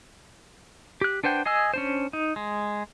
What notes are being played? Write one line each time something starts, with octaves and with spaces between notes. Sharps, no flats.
G4 F#6
D4 B4 C5 F#5 G5
G#4 D#5 G#5 E6
C#4 D4 C5
D#4
G#3